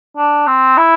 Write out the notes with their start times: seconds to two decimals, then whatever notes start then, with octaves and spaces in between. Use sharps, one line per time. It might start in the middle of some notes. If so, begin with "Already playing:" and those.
0.17 D4
0.47 C4
0.77 E4